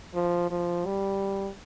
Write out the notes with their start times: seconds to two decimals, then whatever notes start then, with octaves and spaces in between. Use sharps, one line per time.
0.14 F3
0.51 F3
0.86 G3